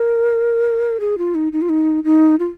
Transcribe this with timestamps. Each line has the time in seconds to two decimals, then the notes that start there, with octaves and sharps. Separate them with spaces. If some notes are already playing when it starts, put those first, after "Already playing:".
Already playing: A#4
1.00 G#4
1.18 F4
1.35 D#4
1.52 D#4
1.62 F4
1.69 D#4
2.04 D#4
2.39 F4